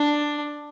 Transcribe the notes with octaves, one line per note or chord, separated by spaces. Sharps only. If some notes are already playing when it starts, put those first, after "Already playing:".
Already playing: D4